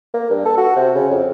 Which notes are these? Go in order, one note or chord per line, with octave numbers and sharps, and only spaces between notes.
A#3
G2
A4
F#4
C3
C#3
F2